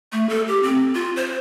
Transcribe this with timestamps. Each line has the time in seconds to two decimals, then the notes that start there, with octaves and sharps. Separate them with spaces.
0.12 A3
0.29 A4
0.48 G4
0.63 C4
0.95 F4
1.16 C5